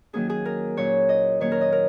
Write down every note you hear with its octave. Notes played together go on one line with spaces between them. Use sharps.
D#3 F#3 A#3 C#4 G#4
G#4
A#4
A#2 F#3 C#4 C#5
D#5
D#3 F#3 A#3 C#4 C#5
A#4
D#5
A#4